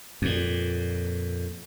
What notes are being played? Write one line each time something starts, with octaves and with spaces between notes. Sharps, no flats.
F2 A#2